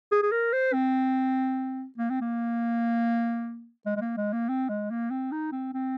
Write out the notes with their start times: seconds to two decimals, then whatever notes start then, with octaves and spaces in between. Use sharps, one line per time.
0.12 G#4
0.23 G#4
0.32 A#4
0.53 C5
0.73 C4
1.98 A#3
2.10 C4
2.21 A#3
3.86 G#3
3.96 G#3
4.01 A#3
4.17 G#3
4.33 A#3
4.49 C4
4.69 G#3
4.90 A#3
5.11 C4
5.32 D#4
5.52 C4
5.74 C4